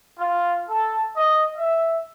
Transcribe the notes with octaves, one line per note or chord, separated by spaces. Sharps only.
F4
A4
D#5
E5